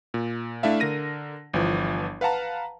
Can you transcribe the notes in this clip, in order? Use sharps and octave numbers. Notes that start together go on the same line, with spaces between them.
A#2
A3 D4 E4 E5 F5
D3 A#4 A#6 D#7
G1 E3 F3
B4 F5 F#5 A5 A#5